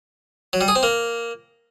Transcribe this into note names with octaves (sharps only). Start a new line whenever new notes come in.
F#3
G3
G#4
C4
A#3